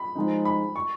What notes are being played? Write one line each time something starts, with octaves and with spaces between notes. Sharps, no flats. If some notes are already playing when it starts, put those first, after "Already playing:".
Already playing: B5
F3 G#3 D#4
B5
C#6